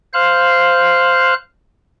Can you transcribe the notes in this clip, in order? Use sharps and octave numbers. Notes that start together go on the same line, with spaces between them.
C5 F5 F#6